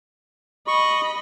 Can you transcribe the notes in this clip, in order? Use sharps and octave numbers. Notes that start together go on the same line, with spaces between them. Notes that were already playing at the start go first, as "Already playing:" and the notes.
D#5 B5 C#6